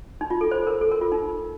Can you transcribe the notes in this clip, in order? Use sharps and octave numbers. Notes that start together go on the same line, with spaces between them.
D#4
F4
A4
C5
A#4
A4
A#4
F4
D#4